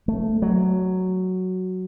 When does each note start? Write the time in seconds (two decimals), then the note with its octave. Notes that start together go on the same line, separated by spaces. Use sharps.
0.08 A3
0.42 F#3